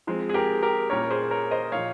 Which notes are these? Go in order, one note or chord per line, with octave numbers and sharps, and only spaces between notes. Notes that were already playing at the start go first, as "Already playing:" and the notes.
F3 G#3 C4
G#4
G4 A#4
G4 A#4
A#2 G3 A#3 C#4 A#4 C#5
G#4 C5
A#4 C#5
C5 D#5
A#2 F3 A#3 C#5 F5